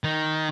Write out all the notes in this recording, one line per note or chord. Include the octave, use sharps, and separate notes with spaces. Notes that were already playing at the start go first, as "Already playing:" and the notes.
D#3